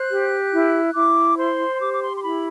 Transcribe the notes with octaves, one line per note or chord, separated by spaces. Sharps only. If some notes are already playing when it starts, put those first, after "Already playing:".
Already playing: C5 F#6
G4
E4
E4 D6
C5 C6
G4 D6
D6
C6
C6
E4 B5